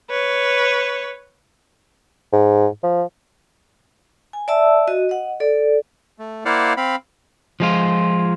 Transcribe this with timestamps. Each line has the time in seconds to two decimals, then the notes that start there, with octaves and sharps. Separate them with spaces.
0.10 B4 C#5
2.33 G#2
2.83 F3
4.33 G#5
4.48 D5 E5 A5 E6
4.88 F#4 D#5
5.09 D#5 F#5
5.40 A4 D5
6.18 A3
6.45 A#3 E4 C5 D5 F5 F#5
6.77 C4 F5 B5
7.60 F3 G#3 F4